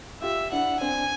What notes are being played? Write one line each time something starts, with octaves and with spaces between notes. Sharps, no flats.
F4 G4 E5
D4 E4 F#5
C4 D4 G#5